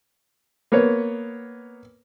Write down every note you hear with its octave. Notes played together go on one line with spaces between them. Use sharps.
A#3 B3 B4 C#5